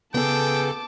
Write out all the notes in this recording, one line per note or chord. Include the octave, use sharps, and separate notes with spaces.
C#3 B3 G#4 A4 G5 A5 D6